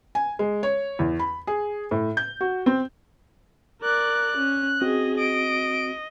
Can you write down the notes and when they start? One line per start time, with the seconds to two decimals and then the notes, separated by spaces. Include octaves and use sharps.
0.15 G#5
0.39 G#3
0.63 C#5
0.99 E2
1.19 B5
1.47 G#4
1.91 A2
2.17 G6
2.41 F#4
2.66 C4
3.82 A#4 D5 F#6
4.37 C#4
4.82 C4 F#4 G#4 D#5
5.17 D#5 D7